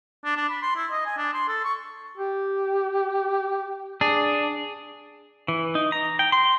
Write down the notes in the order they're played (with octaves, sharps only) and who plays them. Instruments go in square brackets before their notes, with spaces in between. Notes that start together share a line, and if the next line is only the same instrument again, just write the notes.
[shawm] D4
D4
B5
C6
E4
D#5
G#5
D4
C6
A4
C#6
[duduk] G4
[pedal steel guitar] D4 [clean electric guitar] G#4
[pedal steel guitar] E3
D#4
A#5
G5
C6